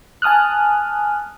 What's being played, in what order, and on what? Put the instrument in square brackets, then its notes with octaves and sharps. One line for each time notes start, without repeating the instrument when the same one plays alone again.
[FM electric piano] G#5 A5 D#6 F6 F#6